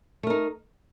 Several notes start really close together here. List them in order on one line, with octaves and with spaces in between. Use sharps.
A3 A#4 D#4